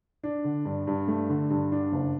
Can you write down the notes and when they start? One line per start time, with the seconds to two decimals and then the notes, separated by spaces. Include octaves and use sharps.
0.24 D4
0.44 D3
0.65 G2
0.87 G2
1.08 A3
1.29 D3
1.50 G2
1.72 D4
1.92 F#1